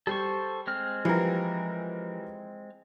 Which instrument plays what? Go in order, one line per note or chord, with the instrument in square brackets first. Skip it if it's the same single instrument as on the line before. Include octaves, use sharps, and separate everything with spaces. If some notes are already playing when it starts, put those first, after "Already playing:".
[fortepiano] G3 [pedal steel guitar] A4 C5 C#6
[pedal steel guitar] G#3 C4 F6
[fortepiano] E3 G3 A#4 [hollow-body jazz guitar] F3